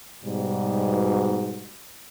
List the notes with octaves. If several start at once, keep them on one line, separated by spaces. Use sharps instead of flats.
G#2 B2 G3